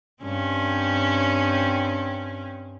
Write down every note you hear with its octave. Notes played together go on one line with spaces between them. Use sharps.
G2 C4 C#4